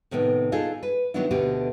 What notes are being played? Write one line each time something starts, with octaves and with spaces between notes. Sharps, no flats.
A2 C3 D#3 B3
D4 D#4 F4 G#4 A4
B4
D#3 F#3 B3 D4 E4
D2 B2 D3 A3 G4 B4